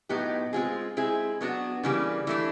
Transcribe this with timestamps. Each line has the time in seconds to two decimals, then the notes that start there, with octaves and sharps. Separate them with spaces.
0.09 A2 F#3 B3 D#4 G4
0.53 G#3 C4 F4 G#4
0.97 G#3 C4 E4 G#4
1.41 F#3 B3 D4 F#4
1.83 C#3 E3 G3 A#3
2.27 E3 A3 D4